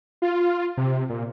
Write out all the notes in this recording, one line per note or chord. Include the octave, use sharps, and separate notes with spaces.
F4
C3
A#2